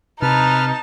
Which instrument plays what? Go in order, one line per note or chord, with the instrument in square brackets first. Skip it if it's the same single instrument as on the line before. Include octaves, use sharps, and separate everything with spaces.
[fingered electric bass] C3 [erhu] D#4 [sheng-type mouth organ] B4 F6 [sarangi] A5